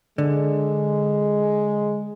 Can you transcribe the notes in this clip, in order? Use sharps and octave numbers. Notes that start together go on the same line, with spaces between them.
D3 G#3